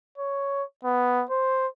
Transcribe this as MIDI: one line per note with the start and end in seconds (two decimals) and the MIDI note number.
0.18 0.63 73
0.84 1.25 59
1.30 1.67 72